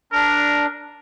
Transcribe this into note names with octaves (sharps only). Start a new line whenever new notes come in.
D4 A#4